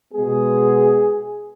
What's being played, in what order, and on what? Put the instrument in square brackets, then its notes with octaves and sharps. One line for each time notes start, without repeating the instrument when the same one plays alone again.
[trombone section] B2 G#3 B3 G#4